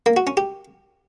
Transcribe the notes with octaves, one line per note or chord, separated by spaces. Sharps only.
A#3
F#4
C#4
G4